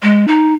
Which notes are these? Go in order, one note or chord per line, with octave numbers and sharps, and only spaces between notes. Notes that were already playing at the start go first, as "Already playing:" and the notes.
G#3
D#4